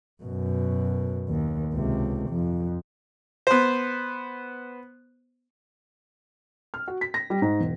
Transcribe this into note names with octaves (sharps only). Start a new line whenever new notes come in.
F#2 B2
D#2
C#2 C3
F2
B3 C5
F6
F#4
B6
A#6
G3
G#2
E1